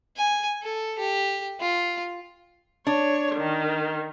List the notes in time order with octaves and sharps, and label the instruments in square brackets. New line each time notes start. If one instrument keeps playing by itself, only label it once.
[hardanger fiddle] G#5
A4
G4
F4
[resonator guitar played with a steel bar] D4 [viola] C#5
[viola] D#3